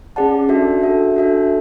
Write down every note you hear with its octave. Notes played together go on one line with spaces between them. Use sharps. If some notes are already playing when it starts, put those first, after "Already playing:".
C#4 G#4 D5 F#5 A5
D4 F#4 A4 E5
D4 F#4 A4 E5
D4 F#4 A4 E5